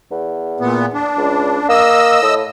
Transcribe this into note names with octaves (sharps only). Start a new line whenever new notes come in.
E2
A#2 B3
D4
C#2
A#3 D#5 E6
A2